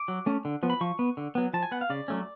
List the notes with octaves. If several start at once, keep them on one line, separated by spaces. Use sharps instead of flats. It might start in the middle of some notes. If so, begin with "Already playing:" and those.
Already playing: D6
F#3
A3 C#4
D3
F3 B3
B5
F3 C#6
B3
D3
F#3 B3
F3 A5
G#5
B3 F#5
F5
C#3 D5
F#3 A3 C#4